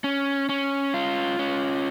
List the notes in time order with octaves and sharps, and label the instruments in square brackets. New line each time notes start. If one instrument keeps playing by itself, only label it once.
[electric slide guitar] C#4
C#4
F4
C#4